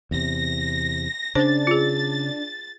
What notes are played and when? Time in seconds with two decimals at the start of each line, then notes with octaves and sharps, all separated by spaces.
0.11 E2 C3 A#6
1.35 C#3 D4 C5 A6
1.67 F4 G#4